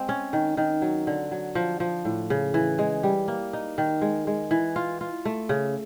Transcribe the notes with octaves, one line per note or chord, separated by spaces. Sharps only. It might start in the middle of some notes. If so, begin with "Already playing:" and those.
Already playing: G#3 C4
C#4
D#3
D#3
F#3
D3
F#3
F3
F3
A2
C#3
E3
G#3
G3
A#3
D#4
D#3
G#3
G#3
E3
F4
F4
A3
C#3